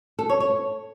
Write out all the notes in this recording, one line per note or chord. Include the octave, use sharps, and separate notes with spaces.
A4
C#5
C#5